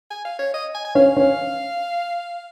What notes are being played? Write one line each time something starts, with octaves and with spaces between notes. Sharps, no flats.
G#5
F5
C#5
D#5
G#5
G#5
C#4 F5
C#4